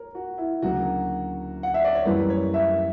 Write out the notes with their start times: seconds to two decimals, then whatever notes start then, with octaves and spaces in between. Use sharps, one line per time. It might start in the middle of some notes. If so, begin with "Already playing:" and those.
Already playing: A#4 C#5
0.15 F#4
0.38 E4
0.62 D2 C#3 F#3 A#3 F#4
1.63 F#5
1.74 E5
1.84 D5
1.95 C#5
2.05 F#2 E3 G3 A#3 B4
2.30 C#5
2.54 E5